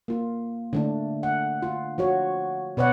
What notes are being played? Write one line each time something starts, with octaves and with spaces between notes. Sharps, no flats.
A#3 F4
D3 A3 D4
F#5
F4
F3 F#4 C#5
B2 B4 C#5 D5 F#5